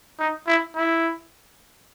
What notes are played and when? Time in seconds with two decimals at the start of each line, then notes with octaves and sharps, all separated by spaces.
0.19 D#4
0.47 E4
0.76 E4